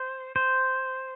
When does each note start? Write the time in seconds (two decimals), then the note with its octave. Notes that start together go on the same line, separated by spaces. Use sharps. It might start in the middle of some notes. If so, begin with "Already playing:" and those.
Already playing: C5
0.36 C5